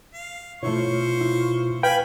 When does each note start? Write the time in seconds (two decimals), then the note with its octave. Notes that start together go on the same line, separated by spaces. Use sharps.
0.14 F5
0.63 B2 A3 E4 F4 C5 C#5 C#6
1.21 E4
1.83 B4 F5 G5 G#5 B5